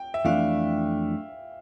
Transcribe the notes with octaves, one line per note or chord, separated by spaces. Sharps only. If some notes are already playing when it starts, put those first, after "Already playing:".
Already playing: G5
E5
F2 E3 A3 D4 F5